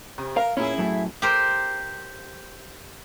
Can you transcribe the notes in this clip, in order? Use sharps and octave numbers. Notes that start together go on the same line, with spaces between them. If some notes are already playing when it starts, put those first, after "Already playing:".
C3
A#4 F5
A#2 C#4 E4 G#4
F#2 A2
G4 A#4 C5